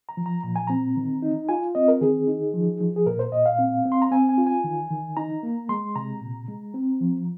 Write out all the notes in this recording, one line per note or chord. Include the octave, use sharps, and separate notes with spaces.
A#5
F3
A#5
A#2 A#5
G#5
C4 A#5
D#3
D#4
F4 G#5
C4 D#5
A#4
D#3 G#4
D#4
F3
F3
G#4
A#2 A#4
C5
A#2 D#5
F5
C4
C4
C6
A#5
C4 G#5
G#5
F4
G#5
D#3
D#3
D#4 A#5
A#3
G#3 C6
C3 A#5
A#2
G#3
C4
F3